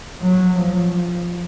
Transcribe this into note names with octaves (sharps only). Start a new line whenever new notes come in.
F#3
F3